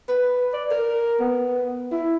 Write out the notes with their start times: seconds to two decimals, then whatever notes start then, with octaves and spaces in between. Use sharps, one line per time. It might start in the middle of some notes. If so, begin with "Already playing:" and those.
0.09 B4
0.53 D5
0.71 A#4
1.20 B3
1.92 E4